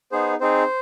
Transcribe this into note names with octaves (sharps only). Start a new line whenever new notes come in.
B3 D#4 G#4 C5
C4 D#4 G#4 C5